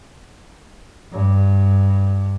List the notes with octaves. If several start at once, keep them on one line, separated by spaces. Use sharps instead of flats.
G2